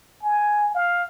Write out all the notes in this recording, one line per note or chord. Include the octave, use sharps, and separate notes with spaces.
G#5
F5